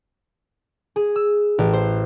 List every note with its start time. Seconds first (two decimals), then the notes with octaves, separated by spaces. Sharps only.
0.96 G#4
1.16 E6
1.58 A1
1.73 C5